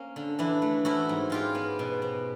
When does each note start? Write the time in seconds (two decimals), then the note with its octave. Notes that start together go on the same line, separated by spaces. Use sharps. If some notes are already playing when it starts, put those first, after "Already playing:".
Already playing: A#3 C#4
0.16 D3
0.39 E3 D4 E4
0.62 A3
0.85 C#4 E4 F#4
1.09 G#2
1.30 G#3 F4 G4
1.55 B3
1.79 B2
2.02 B2